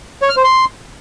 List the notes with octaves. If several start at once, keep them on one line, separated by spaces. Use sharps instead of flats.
C#5
F6
C5
C6